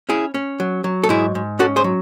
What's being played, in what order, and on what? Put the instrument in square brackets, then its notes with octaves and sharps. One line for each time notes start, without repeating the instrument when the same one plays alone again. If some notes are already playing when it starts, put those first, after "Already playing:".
[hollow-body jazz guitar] C#4 E4 G#4
C#4
F#3
F#3
A4
G#2 E4 G#4
G#2
C#4 F#4 A4
G#4 C5
F#3